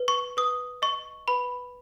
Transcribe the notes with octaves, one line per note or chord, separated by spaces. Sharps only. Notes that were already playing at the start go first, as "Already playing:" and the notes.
Already playing: B4
C#6
B4 D#6
D#5 C#6
B4 B5